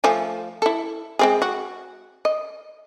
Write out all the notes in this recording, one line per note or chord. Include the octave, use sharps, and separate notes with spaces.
F3 A3 G#5
E4 A4
G#3 C4 G#4
F#4
D#5